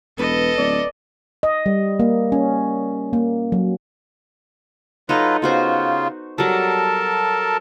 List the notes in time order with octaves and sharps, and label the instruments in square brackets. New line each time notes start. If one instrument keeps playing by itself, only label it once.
[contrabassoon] E1 [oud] B3 B4 [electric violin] A4 D#5
[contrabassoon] D1 [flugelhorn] D5
[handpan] D#5
G3
A#3
C#4
A#3
F#3
[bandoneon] F#3 F4 B4 [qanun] D#4 A4 D#5
[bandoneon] C#3 F4 [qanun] B3 F#4 C5
[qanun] F#3 G3 [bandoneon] A4 A#4 A5